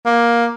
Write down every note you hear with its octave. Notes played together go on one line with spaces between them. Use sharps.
A#3